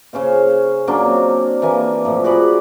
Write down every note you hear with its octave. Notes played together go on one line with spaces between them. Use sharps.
C#3 C#4 C5 F5
F#3 A#3 C#4 D4
C4
E3 A#3 G#5
A2 F3
F#4 G#4 D5 B5